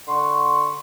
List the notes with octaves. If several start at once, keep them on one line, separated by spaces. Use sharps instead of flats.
D3 F#5 C6 C#6